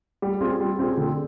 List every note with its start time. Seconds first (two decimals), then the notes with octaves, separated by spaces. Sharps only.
0.22 G3
0.41 C4 F4 G#4
0.60 G3
0.79 C4 F4 G#4
0.97 D3